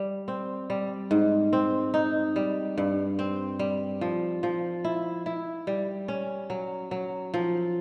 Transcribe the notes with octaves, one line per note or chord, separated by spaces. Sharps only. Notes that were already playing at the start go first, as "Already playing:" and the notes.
Already playing: G3
C4
G3
G#2
C4
D#4
G3
G2
C4
G3
F3
F3
E4
E4
G3
C#4
F#3
F#3
F3